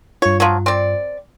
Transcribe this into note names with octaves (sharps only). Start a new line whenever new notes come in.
G2 F4 C#5
F3 F#3
C4 D5